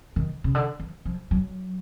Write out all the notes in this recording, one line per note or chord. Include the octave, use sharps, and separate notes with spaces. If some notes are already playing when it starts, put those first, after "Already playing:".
D#3
C#3
D3
E3
F3
F#3